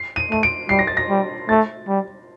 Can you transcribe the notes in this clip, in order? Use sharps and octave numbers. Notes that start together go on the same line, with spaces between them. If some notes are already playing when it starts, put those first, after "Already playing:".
Already playing: C7
D#7
A3 D#7
D7
G3 C7
A#6
A6
A#6
G3
A3 A6
G3